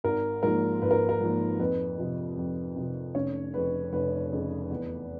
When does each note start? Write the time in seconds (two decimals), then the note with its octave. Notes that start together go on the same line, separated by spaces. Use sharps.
0.04 G#1 A#4
0.43 G#2 F3 A#3 A#4
0.82 G#1 B4
0.91 A#4
1.09 A#4
1.21 G#2 F3 A#3
1.59 F2 B4
1.98 C3 F3
2.37 F2
2.76 C3 F3
3.15 F1 C#4 C#5
3.53 F2 C#3 B4
3.93 F1 B4
4.31 F2 C#3
4.70 E2